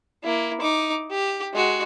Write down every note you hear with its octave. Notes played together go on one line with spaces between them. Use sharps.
A#3 E4
D#4 D6
G4
G#3 F#4